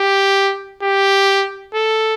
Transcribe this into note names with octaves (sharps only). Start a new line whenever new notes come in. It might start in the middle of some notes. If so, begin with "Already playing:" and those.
Already playing: G4
G4
A4